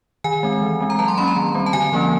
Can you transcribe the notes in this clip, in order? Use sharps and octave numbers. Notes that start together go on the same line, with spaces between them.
D#3 G#5
G#3 C4
E3
G#3 C4
A#5
F#3 A5
C6
A#3 C#4 B5
A#5
D#3
G3 C4
A5
D3 G#5
F3 A#3 C#4